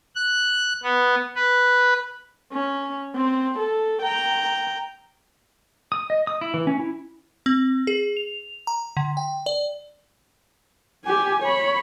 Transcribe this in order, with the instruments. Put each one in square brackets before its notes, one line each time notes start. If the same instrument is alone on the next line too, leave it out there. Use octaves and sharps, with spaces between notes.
[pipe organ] F#6
B3
B4
[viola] C#4
C4
A4
G5 A#5
[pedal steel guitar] D#6
D#5
D#6
E4
E3
C#4
E4
[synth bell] C4
G#4
F7
A#5
D3
G5
D5
[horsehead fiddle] G4 G#5
C#5 B5